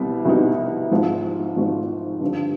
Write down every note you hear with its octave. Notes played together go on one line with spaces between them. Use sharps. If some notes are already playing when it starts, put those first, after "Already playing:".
Already playing: C2 B2 G3 C4
C2 B2 G3 C4 D#4
G#1 G#2 F3
G#1 G#2 F3
G2 D3 F3